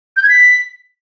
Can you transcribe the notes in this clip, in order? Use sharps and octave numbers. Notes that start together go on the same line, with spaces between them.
G6
G#6
B6